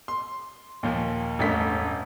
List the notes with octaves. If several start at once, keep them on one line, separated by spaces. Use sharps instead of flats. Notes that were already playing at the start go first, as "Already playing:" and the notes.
C6
D#2 A#2 F3
E1 A1 G2 A3 B6